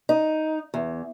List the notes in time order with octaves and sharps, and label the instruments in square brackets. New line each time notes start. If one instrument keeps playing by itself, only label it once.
[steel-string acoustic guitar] D#4
E2